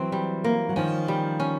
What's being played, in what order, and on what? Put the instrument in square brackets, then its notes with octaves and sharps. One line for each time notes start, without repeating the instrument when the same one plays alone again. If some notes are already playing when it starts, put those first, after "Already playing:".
Already playing: [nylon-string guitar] E3 F#3 [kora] C4
[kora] G3
A#3
[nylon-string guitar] F#3
[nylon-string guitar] D#3 F3 [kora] C#4
[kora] G3
C#4